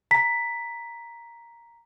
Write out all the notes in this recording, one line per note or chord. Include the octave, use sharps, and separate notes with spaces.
A#5 B6